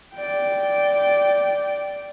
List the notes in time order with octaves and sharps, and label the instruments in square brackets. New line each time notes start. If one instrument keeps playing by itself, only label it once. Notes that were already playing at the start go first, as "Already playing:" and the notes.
[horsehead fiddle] D5 G5